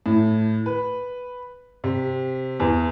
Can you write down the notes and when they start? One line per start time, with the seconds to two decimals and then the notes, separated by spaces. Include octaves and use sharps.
0.06 A2
0.66 B4
1.84 C3
2.60 E2